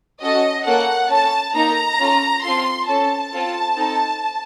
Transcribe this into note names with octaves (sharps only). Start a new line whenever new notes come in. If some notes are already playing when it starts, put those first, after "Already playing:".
C#4 F#4 A4 D#5
A#3 C#4 A4 F#5
C#4 A4 A5
A#3 D#4 A4 A#5
C#4 F4 A4
C4 F4 A4 C6
C#4 A4 A5
C4 F4 A4
C4 D#4 A4